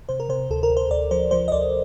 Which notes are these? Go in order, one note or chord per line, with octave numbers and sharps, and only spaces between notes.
C3 C5
A#4
C3 C5
D2 A4
A#4
D2
C5
D2 D5
F3 C5
F3 C5
D#5
D2 D5